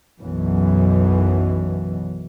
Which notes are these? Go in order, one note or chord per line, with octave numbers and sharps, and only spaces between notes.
B1 F#2 B2 E3